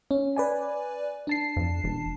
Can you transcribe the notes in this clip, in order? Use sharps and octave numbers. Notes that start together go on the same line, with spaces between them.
C#4
B4 D5 G#5
D4 A5 C7
F2
E1